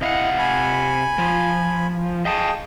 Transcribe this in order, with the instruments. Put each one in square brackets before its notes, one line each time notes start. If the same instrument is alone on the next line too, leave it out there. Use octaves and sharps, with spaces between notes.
[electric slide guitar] C3 F5 F#5 [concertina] E4 D#5
[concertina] G#5 B5
[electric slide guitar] F3
[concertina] G#4 G5 [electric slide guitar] D#5 F5 A5